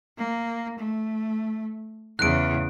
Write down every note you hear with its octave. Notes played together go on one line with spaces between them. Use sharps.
A#3
A3
E2 C#3 F#6 D7